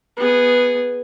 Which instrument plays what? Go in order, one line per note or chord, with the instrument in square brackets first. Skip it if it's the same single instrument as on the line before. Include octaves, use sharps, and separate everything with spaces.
[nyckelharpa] B3 G#4